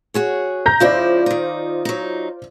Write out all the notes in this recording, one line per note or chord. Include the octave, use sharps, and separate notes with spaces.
F#4 G#4 C#5
A#5 G6 A#6
C#3 F3 E4 F4 C5 D5
D#3 D#4
F#3 D#4